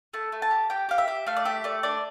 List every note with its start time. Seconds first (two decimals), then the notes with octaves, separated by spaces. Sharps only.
0.14 A3 A5
0.32 A3
0.42 A5
0.51 G4
0.70 G4 G5
0.89 G4 F5
0.98 E5
1.08 G4
1.26 A3 F5
1.37 D5
1.45 G4 E5
1.64 A3 D5
1.83 D4 D5